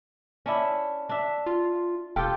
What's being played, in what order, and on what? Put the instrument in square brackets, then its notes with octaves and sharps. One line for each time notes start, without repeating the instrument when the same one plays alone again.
[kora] C#4 D4 E4
D4 E5
[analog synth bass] F4
[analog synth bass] E1 [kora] F4 G4 A4 [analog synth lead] G5